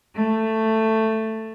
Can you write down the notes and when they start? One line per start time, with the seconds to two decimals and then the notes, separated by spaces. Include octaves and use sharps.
0.14 A3